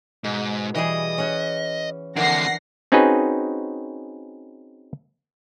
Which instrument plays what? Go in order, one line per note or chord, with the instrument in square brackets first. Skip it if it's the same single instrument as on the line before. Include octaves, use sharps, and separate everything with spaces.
[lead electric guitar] G#2 [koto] B2
[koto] E3 G3 G#4 [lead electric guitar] D#5
[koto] C#4 F#5
[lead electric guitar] F2 D3 [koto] E3 D4 A#4 [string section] F#5 A#6 C7
[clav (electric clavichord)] C4 C#4 D#4 F#4 G#4 B4